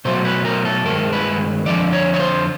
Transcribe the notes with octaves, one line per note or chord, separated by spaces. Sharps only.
B2 F#3 A3 C5
B4
A#4
A4
G2 D#3 G#3 A#4
B4
F2 D3 F3 D5
C#5
C#5
C5